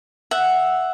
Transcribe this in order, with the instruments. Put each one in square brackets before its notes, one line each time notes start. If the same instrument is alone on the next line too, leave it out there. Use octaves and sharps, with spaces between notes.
[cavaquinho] E5 F#5